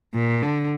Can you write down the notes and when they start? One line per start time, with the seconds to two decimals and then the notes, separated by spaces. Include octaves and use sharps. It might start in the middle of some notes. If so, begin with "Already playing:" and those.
0.14 A#2
0.42 D3